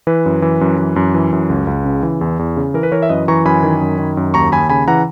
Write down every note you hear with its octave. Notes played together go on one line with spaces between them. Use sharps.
E3 B4
F#2
E3
F#2
E3
F#2
E3
F#2
C#2
C#2
C#3
E3
E2
E2
C#3
E3 A#4
B4
E3 A#4 C#5
E5
F#2 B4 D#5
E3 A#5 C#6
F#2 G#5 B5
D#3
F#2
D#3
F#2
D#2 A#5 C#6
D#2 G#5 B5
C#3 G#5 B5
E3 F#5 A#5